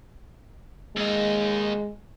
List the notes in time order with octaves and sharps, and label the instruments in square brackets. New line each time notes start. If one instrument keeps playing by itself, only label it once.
[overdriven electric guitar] D#2 D#4 [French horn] G#3